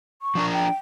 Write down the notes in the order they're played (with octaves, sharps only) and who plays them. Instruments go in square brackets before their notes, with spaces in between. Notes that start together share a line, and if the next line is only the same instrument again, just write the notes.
[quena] C#6
[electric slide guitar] F3 D4 A#4
[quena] G5